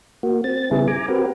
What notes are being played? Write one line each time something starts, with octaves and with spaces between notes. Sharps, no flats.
A#3 F#4
C4 A6
C#3 G3 B3 E4 G#4
G#5 A#5 D6
C4 F#4 G4 A#4 B4